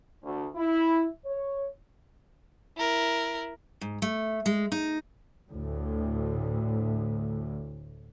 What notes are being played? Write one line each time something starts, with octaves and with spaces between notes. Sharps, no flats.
D2
E4
C#5
E4 A#4
G#2
A3
G#3
D#4
D2 A2